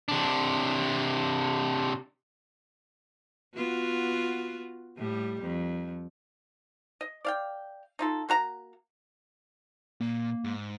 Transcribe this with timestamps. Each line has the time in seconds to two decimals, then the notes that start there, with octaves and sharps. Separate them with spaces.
0.08 C3 D4
3.56 B3 F4 F#4
4.97 A2 G3
5.42 F2
7.01 D#5
7.25 D5 F5 G5
7.99 D#4 F4 A4
8.29 A#3 F#4 A#5
10.01 A#2 A#3
10.44 G#2